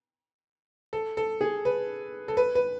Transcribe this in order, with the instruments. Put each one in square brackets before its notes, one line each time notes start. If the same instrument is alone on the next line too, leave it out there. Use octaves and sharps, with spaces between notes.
[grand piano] A4
A4
G#4
B4
A4
B4
B4